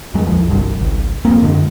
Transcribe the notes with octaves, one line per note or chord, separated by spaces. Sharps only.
F2 F#3 G#3
A#1 E2 F3
G1 C2 G2
G#1 C#2
D1 F2 A#3 C4
F#2 D3 G#3